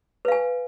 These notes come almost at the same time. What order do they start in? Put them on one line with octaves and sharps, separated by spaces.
B4 F5 G#5